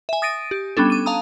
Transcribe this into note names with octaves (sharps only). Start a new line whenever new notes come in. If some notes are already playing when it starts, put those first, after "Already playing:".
E5 G#5
D#6 A6 A#6 D7 D#7
G4
G3 B3 C#4 D4 A4
D6 D#7
F5 A5 A#5 D#6